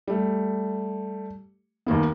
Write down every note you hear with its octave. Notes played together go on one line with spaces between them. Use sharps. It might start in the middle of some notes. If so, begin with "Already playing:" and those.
G3 A3
D#2 D#3 A#3 B3